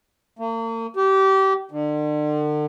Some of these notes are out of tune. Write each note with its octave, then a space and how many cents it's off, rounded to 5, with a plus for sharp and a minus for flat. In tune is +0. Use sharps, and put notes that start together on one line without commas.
A#3 -40
G4 -25
D3 +40